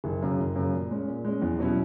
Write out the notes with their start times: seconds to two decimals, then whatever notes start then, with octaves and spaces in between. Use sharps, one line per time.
0.04 F#1
0.22 F#2 C#3
0.39 F#1
0.56 F#2 C#3
0.73 A#2
0.91 G#3 C#4
1.07 A#2
1.25 G#3 C#4
1.42 E2
1.59 B2 F#3 C#4 E4